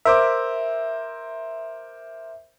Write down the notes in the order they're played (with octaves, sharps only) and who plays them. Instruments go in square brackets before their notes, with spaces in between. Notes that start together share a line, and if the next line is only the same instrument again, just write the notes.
[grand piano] A#4 C5 D6 [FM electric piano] E5